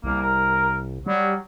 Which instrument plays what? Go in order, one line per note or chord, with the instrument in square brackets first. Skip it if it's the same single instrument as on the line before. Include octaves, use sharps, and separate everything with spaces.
[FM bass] C2 [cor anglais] A#3
[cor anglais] A#4
[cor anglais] F#3 [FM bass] G3